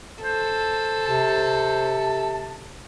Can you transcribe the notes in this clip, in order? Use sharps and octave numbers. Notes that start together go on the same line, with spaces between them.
A4 C5
C3 A5